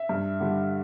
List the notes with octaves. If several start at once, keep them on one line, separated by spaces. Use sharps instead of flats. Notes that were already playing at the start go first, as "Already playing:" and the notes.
Already playing: E5
G2
D3 G3